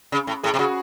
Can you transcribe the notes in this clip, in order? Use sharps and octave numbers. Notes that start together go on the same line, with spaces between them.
C#3
A2
A2 G#4
C3
C#3 F#4